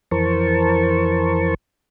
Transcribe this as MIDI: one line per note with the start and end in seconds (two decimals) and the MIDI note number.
0.11 1.54 41
0.11 1.54 52
0.11 1.54 70
0.11 1.54 72
0.11 1.54 81
0.11 1.54 85